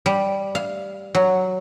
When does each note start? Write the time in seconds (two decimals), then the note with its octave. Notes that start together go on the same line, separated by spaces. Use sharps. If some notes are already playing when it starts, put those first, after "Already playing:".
0.06 G3
0.55 F5
1.15 F#3